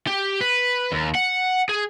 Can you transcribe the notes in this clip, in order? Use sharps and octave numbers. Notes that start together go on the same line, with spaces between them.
G4
B4
D#2
F#5
G#4